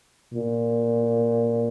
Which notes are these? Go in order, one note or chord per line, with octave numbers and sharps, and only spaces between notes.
A#2